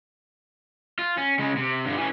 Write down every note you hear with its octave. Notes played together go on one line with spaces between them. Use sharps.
F4
C#4
C#3 G#3
C3
G2 D3
E3 C#4